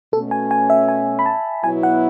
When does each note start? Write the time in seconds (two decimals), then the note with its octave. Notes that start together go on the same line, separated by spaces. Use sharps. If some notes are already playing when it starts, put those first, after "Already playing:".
0.13 B2 A3 C#4 A4
0.31 G#5
0.51 G#5
0.70 E5
0.88 G#5
1.19 B5
1.26 A5
1.64 B2 F#3 B3 E4 G#5
1.83 F#5